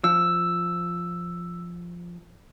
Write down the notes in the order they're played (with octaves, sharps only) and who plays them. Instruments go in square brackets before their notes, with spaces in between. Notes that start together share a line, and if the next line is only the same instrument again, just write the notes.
[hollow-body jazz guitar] F3 [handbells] E6